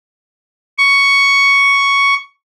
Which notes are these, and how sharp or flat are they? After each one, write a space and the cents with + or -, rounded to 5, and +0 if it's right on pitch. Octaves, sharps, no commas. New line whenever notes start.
C#6 +5